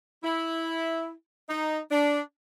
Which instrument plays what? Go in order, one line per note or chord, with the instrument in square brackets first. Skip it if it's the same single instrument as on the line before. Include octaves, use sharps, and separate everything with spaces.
[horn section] E4
D#4
D4